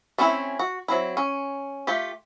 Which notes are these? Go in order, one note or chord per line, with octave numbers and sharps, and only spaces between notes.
A3 C4 C#4 E4 G#5
F#4
F#3 C4 E4
C#4
A3 F4 G4